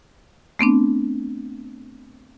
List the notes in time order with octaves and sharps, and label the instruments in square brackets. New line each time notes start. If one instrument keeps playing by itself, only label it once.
[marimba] A3 B3 C4 D4